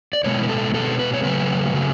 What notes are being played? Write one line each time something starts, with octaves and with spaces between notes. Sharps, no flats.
D5
B2 G#3 B3 C#5
B4
A4
B2 G#3 B3 A4
B4
C#5
C#3 F#3 A3 B4
C#3 F#3 A3